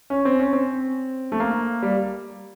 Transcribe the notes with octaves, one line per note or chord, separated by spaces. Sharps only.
C#4
C4
C#4
C4
A3
A#3
G3